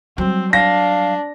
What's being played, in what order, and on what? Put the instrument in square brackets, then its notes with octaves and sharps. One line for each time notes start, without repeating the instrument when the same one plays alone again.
[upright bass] F#3 G3 [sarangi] C4
[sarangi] D4 [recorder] F5 [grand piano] A#6